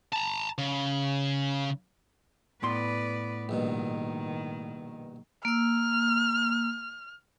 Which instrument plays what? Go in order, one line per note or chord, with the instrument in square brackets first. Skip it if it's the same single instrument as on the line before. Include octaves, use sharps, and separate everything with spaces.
[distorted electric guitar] A5 A#5
C#3
[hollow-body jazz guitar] A2 B3 C6 [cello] B4 D5
[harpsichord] A#1 G2 B2 [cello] D#3
[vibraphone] A#3 E6 [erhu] F6